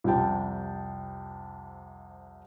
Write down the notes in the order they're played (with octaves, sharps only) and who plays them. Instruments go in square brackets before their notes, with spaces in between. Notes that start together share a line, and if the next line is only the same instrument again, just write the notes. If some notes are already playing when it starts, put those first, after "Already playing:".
[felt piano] C2 F2 C3 G5 A5